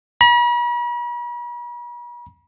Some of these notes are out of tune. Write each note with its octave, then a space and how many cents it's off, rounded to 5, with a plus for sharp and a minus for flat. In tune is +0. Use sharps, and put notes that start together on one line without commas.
B5 -45